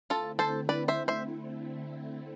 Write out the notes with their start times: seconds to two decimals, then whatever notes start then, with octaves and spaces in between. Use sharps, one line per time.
0.10 D3 A3 C4 E4 F4 A4
0.39 A4 C5
0.69 B4 D5
0.88 C5 E5
1.08 C5 E5